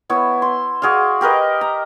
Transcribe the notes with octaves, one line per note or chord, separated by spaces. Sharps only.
B3 E4 C#5
C6
F#4 G#4 D5 F5
G4 A#4 B4 D#5
A#5